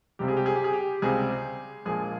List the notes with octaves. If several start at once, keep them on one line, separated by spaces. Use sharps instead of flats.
C#2 C3 G3 C4 G4
G#4
G4
G#4
G4
G#4
G4
C#2 C3 G3 C4 G#4
A#1 A#2 F3 G#3 G#4